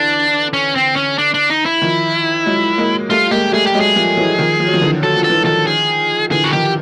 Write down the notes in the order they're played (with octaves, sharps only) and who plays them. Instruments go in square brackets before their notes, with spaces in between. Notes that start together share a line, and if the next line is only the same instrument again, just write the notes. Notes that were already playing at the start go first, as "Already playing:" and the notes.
Already playing: [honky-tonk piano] D3 E3 [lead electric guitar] D4
[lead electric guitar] C#4
C4
C#4
D4
D4
D#4
E4
[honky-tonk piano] D#3 F3
F#3 G#3
G#3 A#3
[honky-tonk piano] G3 A3 [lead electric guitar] F4
[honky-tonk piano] G#3 A#3 [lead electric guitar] G4
[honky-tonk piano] G3 A3 [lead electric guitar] G#4
[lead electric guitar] G4
[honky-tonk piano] F#3 G#3
[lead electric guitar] G#4
[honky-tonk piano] F3 G3
E3 F#3
D#3 F3
F3
F#3
D#3 F3
D3 E3
[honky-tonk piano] F#3 [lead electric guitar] A4
[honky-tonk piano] F3
[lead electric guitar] A4
[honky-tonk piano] E3
[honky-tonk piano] D#3 F3 [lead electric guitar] A4
[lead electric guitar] G#4
[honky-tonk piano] D3 E3 [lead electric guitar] G#4
[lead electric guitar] F#4
[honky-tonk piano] D#3 F3 [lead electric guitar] G4